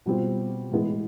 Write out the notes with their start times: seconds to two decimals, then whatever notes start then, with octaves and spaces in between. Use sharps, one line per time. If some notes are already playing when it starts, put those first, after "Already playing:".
0.06 B2 G3 C4 F4
0.71 A2 E3 G#3 B3